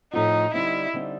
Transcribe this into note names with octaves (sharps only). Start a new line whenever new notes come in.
A2 F3 A3 C4 D#4 F4
D3 G3 C4 D#4 E4
D3 G3 C4 D#4